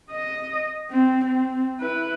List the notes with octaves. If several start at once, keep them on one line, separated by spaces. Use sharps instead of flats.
D#5
C4
C4
E4 B4